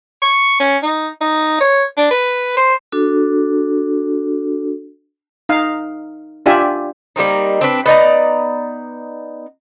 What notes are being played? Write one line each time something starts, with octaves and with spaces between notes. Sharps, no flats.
C#6
C#4
D#4
D#4
C#5
D4
B4
C5
D4 F#4 A4
D#4 F5
D4 F4 G4 D5 E5 G#5
G3 A#3 C4 D#4
C4 D4 B4
B3 D#4 D5 A#5